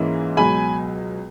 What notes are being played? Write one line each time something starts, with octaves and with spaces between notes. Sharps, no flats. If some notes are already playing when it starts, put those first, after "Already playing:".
Already playing: G#2 E3 A#3 C#4 E4
C#2 B2 F#3 G#5 B5